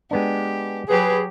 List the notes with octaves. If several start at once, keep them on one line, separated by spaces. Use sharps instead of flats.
G#3 B3 D4 G4
F#3 G4 G#4 B4